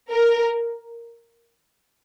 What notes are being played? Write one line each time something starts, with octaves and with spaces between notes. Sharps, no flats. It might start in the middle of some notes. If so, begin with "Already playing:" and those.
A#4